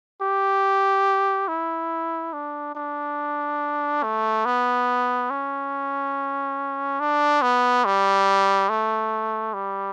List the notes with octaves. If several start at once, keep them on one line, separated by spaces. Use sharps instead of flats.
G4
E4
D4
D4
A3
B3
C#4
D4
B3
G3
A3
G3